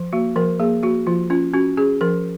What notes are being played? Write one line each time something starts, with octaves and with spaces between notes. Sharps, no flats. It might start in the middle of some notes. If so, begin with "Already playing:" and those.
Already playing: F3
A#3 F#4
F3 A#4
A#3 G#4
A#3 F#4
F3 F4
C#4 F4
C#4 F#4
C#4 G#4
F3 A#4